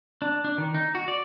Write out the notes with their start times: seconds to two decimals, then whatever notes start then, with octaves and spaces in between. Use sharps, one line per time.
0.22 D4
0.44 D4
0.58 D#3
0.75 D#4
0.95 F#4
1.08 D5